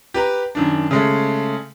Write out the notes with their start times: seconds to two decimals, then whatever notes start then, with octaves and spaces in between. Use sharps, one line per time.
0.14 G4 B4 A#5
0.55 F#2 D#3 D4
0.91 C#3 G#3 A3